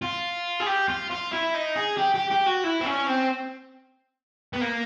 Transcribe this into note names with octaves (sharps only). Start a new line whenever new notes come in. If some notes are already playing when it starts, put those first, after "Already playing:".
F4
G#4
G4
F4
F4
E4
D#4
G#4
G4
G4
G4
F#4
E4
C4
C#4
C4
B3
A#3